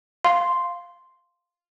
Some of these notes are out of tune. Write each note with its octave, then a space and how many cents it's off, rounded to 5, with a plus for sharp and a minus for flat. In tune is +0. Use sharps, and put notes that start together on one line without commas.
F5 +0 C6 +0